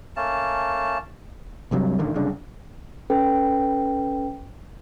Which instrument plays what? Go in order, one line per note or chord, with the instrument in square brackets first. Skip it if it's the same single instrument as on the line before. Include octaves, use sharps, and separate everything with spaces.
[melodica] A3 A#3 C#4 A5
[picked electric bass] C2 G2 C3 F#3
D#1 A1 D3 D#3
F#1 C2 C#3 D4
[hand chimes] C#4 A4 B4 G5